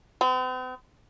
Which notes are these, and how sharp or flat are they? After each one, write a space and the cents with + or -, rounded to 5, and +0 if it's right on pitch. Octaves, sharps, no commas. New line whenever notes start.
C4 -45